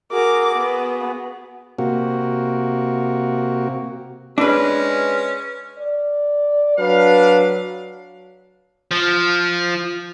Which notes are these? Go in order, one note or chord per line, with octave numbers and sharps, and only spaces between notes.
F#4 G#4 A#4 D6
B3
C3 A#3 F#4
G#3 C#4 D4 B4
D5
F#3 D4 B4 F5
F3